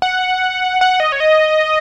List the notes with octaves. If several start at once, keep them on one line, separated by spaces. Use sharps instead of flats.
F#5
F#5
D#5
C#5
D#5